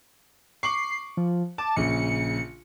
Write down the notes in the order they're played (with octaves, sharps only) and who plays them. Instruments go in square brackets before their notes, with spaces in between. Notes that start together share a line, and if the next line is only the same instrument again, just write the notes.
[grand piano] C#6 D6 F#7 [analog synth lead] C7
[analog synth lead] F3
[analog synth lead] A5 [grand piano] D6
[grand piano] A#1 C#3 [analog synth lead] C#7